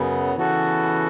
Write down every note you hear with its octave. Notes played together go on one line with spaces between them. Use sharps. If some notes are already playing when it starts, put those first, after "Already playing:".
Already playing: F#2 C#3 F#3 B3
C#3 E3 B3 F#4 A4